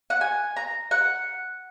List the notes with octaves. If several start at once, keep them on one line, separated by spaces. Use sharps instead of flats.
F#5
G#5
A#5
F#5